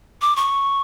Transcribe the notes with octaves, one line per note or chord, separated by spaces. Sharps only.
D6
C#6